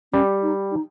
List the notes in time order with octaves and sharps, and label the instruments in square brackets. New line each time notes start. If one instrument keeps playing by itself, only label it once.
[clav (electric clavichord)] G3 [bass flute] C#4
[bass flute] D#4
D#4